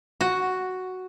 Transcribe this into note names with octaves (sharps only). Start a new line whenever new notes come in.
F#4